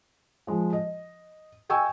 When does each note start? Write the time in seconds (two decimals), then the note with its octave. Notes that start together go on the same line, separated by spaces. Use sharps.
0.47 F3 G#3
0.73 D#5
1.69 D#5 G5 G#5 C#6 E6